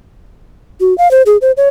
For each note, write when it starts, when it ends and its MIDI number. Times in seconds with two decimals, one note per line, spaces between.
0.81 0.96 66
0.98 1.10 77
1.11 1.22 72
1.26 1.37 68
1.41 1.52 72
1.57 1.69 73